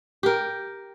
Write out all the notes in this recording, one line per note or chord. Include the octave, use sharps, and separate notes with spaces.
G4 A#4